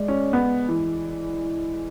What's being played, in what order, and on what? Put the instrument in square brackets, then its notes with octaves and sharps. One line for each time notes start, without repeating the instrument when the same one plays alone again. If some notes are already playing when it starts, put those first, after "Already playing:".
Already playing: [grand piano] G#3 D5
[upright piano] C#4
B3
E3